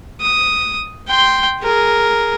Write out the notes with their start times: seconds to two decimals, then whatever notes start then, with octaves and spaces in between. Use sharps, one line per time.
0.21 D#6
1.08 G5 C6
1.61 G#4 A#4